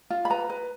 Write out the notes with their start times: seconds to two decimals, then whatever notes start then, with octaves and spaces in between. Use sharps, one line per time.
0.10 F4
0.25 B5
0.30 B4 A#5
0.50 B4